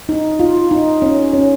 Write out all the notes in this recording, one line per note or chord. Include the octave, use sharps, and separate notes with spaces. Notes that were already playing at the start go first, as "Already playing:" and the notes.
D#4
F4
D#4
C#4
C#4